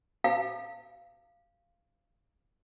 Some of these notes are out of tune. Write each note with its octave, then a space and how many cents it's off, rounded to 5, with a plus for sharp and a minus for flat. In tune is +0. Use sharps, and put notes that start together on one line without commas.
F5 -15